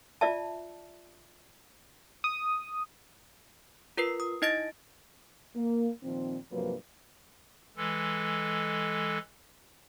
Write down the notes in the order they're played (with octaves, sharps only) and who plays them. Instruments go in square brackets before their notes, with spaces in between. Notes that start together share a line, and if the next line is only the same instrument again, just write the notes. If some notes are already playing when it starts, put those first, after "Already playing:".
[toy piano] F4 D5 E5 A5
[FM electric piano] D#6
[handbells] F4 A#4 B4 C7
D#6
D#4 E4 D#5 A6 A#6 D7
[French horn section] A#3
A#2 D#3 F3 C4
G2 C3 F3 F#3 A#3 B4
[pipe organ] E3 G#3 A4